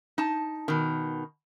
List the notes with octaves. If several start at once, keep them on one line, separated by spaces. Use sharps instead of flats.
D#4 A5
B2 D#3